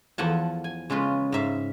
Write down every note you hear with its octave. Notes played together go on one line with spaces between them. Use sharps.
E2 F3 A4 F#5 G#5 A5
G#5
C#3 G#3 C#4 F4 B4
G#2 E5 F5